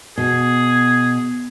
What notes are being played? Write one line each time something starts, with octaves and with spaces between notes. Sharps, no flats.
B2 G#4